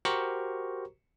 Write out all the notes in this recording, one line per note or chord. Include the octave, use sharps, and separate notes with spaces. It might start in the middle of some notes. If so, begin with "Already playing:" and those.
F#4 G4 A#4 C5 A#5 C#6